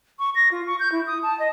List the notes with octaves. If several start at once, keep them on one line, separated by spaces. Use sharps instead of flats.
C#6
A#6
F4
C#6
G6
E4
D#6
A5
D#5